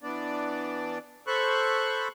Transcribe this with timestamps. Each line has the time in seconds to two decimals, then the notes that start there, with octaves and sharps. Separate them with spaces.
0.03 E3 B3 D4 D5
1.27 A4 C5 B5 C#6 F#6